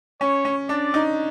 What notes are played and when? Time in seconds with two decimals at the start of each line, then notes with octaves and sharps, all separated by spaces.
0.21 C#4 C#5
0.45 C#4
0.69 D4 D5
0.94 D#4